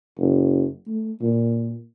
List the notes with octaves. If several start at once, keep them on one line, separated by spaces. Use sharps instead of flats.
F#1
A3
A#2